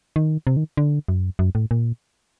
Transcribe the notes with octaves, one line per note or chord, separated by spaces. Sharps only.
D#3
C3
D#3
D3
F#2
F#2
A2
A#2